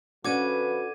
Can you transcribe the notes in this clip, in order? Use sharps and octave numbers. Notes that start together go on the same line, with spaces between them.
D3 F3 C#4 F#4 B4 D6 G#6 D#7